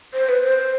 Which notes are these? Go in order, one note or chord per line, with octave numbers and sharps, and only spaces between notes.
C5
B4
C5